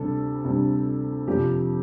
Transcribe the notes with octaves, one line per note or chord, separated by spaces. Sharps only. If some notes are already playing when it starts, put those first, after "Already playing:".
Already playing: D2 C3 G3 A4
D2 C3 G3
F2 C3 F3 G4